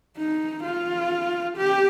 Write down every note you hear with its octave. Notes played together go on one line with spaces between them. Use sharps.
D#4
F4
G4